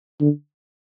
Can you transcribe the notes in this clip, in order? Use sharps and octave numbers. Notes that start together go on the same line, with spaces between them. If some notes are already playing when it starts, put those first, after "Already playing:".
D3